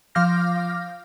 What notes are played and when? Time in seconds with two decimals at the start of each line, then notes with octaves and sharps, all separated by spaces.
0.15 F3 F5 D6 F6 G6 A#6